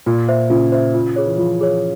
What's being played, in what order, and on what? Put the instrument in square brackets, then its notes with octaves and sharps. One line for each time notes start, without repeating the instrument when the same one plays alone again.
[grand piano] A#2 [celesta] F4
[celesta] C5 E5
[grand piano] C#3 [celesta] F4
[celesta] C5 E5
F4
G#4 C#5
[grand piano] E3
[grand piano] F3 [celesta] F4
[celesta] G#4 C#5